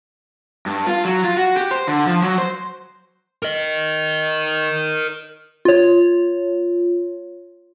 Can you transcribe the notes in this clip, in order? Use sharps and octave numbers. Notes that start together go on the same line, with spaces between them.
G2
F4
F#3
F4
F#4
G4
C5
D3
F3
F#3
C5
A#4 D#5
F4 C#5